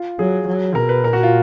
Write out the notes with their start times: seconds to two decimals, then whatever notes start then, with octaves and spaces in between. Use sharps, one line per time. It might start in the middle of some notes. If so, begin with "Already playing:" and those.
Already playing: F4
0.19 F#3 G#4
0.48 F#3
0.75 B2 A#4
0.89 B4
1.04 A#2 A#4
1.13 F#4
1.23 F4